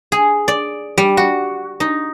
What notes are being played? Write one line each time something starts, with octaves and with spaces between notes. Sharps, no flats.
G#4
D5
G3
F#4
D#4